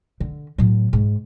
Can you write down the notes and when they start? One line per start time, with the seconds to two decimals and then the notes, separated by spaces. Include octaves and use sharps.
0.20 D3
0.58 A2 F#3
0.93 G#2